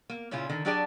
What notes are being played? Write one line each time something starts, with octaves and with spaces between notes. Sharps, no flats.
A#3
A#2 C#3 C#4 E4 F4
D3 D#3
F#3 D4 G4 G#4 D5 A5